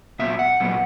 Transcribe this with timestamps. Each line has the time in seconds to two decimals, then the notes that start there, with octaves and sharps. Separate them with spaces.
0.19 A#2 F#3 B3 E5
0.39 F#5
0.60 A#2 F#3 B3